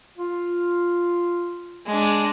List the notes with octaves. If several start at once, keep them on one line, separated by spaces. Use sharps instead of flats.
F4
G#3 D4